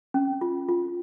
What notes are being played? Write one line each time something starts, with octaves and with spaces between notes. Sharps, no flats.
C#4
F4
F4